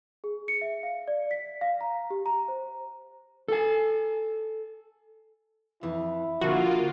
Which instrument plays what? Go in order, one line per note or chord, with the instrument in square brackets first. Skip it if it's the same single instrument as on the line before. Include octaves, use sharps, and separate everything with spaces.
[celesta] G#4
C#7
E5
F5
D5
B6
F5
A#5
G4
A#5
C5
[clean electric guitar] A4 G#5
[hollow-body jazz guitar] F2 E3 [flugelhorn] E4
[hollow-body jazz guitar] D3 F3 [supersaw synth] A#3 F4 [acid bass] F#4